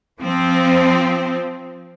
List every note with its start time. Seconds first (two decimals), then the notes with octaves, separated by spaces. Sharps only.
0.21 F3 C4